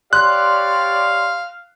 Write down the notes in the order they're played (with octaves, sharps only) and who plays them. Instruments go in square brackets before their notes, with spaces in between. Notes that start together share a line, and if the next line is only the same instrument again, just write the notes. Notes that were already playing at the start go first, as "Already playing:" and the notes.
[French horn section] G4 C#5 D5 [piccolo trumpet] F5 [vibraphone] C6 [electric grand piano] F#6